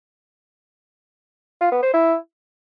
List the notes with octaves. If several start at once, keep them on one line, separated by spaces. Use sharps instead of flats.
F4
B3
C5
E4